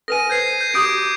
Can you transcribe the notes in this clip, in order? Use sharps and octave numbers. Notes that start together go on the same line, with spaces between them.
A4 B4 G#5 A#6 D#7
C5 G6 G#6 C7
G6
F#4 G4 D6 D#6 G6 D7